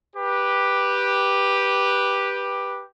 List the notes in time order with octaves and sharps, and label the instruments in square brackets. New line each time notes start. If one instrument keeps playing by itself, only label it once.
[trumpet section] G4 B4